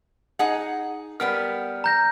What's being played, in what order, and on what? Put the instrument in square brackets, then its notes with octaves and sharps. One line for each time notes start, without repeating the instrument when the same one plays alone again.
[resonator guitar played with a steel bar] D#4 G#4 F#5
[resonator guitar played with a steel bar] G3 B3 A#4 [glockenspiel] F6
[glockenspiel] A#5 G6 A#6